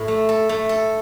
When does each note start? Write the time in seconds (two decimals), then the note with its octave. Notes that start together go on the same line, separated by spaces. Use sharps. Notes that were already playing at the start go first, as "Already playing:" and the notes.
Already playing: A2 A4
0.08 A3
0.29 A4
0.49 A3
0.69 A4